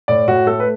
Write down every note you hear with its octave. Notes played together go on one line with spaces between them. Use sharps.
A2 D5
A2 F#4
A3 A4
B4